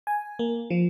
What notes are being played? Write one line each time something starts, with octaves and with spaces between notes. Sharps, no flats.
G#5
A#3
F3